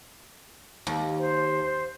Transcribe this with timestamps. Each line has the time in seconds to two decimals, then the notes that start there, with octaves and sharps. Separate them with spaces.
0.87 D#2
1.19 C5